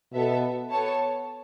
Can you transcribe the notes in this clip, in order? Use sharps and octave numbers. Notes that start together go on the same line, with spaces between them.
B2 B3 A4 E5
B3 A4 C#5 A5